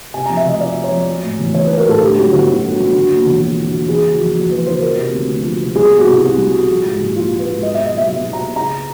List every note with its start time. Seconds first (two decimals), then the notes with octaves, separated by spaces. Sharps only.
0.14 C3 G#5
0.26 A#5
0.29 F2
0.37 E5
0.45 F1 D#5
0.60 F3 D5
0.77 C3
0.84 C#5
0.91 F2
1.07 F#3
1.23 A2
1.39 A1
1.54 A1 C#5
1.66 B4
1.70 F#3
1.78 A#4
1.85 A2 A4
2.01 D3 G4
2.16 F#2 F#4
2.32 G1 F#4
2.48 G1
2.64 D3
2.79 F#2
2.95 D3
3.10 D#2
3.26 E1
3.41 F3 F#4
3.57 D3
3.65 F#4
3.73 D#2
3.88 E3 G#4
4.04 C#3
4.12 F#4
4.19 F2
4.35 F2 F#4
4.51 E3 B4
4.66 C#3 C5
4.82 F3 A#4
4.97 C3
5.13 D2
5.28 D2
5.44 F3
5.60 C3
5.75 G3 G#4
5.91 B2
5.99 F#4
6.06 C2
6.22 C2
6.38 G3
6.53 B2
6.69 F3
6.85 G#2
7.00 A#1
7.15 A#1 F4
7.31 F3
7.39 B4
7.47 G#2
7.63 F#3 D#5
7.74 E5
7.78 B2
7.86 D#5
7.93 B1 E5
8.09 B1 E5
8.25 F#3
8.33 A#5
8.40 B2
8.56 C#3 A#5